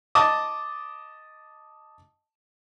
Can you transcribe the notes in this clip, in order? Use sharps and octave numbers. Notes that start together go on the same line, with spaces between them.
D#5 A5 D6 D#6